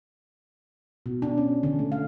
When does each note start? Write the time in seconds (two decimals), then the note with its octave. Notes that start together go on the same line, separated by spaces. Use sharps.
1.06 B2
1.22 D4
1.37 C#4
1.63 D3
1.79 A3
1.92 F5